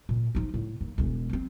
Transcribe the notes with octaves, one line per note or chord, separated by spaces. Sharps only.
A#2
F3 D#4
A2
D#2
E1 G#3
F3 C4